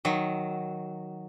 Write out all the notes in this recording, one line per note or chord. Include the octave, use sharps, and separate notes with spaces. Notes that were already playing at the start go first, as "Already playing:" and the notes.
D#3 F#3